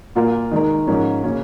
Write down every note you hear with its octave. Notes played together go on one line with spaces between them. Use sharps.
A#2 A#3 F4 A#4
D#3 G#3 D#4 A#4
G#2 F3 C#4 A#4
C#3 A#3 C#4